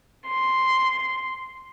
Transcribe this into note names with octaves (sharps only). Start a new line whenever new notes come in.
C6